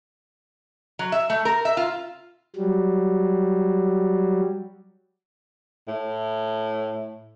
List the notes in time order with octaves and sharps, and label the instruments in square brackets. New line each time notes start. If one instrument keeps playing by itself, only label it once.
[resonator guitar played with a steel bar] F#3
E5
A3
A#4
E5
F4
[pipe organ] F#3 G3
[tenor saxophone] A2